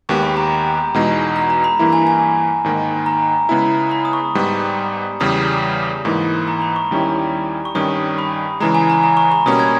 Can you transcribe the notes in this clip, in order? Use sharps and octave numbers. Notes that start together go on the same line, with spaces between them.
D#2 D#3 G#3 B3 G4 C#6
B5
A#5
E2 B2 G#3 D#4
A#5
A#5
B5
G2 E3 A#3 E4
G#5
G#5
G#2 D#3 A#3
A#5
C#3 G#3 B3 E4
B5
D#6
C#6
G#2 G3 B3
E2 C#3 G3 D#6
G#2 E3 A#3 B5
A#5
B5
C#6
D#2 D#3 G3 C#4 E4
C#6
G2 D#3 G3 C#4 D#6
B5
C#3 E3 G#3 A#5
G#5
A#5
A#5
C#6
B5
B2 G3 A#3 C#4 D#6
G#6